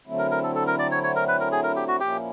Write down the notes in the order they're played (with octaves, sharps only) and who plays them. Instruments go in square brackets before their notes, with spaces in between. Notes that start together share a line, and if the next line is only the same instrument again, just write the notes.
[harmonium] D3 F#3 A3 C4 E4
[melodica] A#4
A#4
A4
A4
A#4
D5
C#5
C#5
A#4
B4
A#4
G#4
A#4
G4
F#4
[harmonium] A#2 F3 A#3 C#4 E4 [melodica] G4